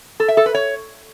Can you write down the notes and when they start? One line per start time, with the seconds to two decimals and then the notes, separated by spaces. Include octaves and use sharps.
0.20 A4
0.28 E5
0.37 A4
0.46 B4
0.54 C#5